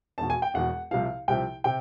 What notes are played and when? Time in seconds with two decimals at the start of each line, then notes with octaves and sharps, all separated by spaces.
0.18 E1 E2 B2 A5
0.30 G#5
0.42 G5
0.54 E1 E2 B2 F#5
0.91 C2 C3 F3 F5
1.28 C2 C3 F3 G5
1.64 C3 G5